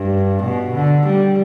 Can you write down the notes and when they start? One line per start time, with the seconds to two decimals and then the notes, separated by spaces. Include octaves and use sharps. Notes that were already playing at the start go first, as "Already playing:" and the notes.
Already playing: G2
0.43 B2
0.74 D3
1.06 G3